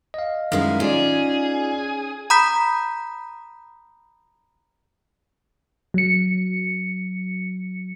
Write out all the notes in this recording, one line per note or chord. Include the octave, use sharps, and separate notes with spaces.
D#5 F5
F#2 D#3 G#3 E4 F5
C#4 D#4 F4 G#4 D5
A#5 B5 D#6 G6 B6
F#3 C#7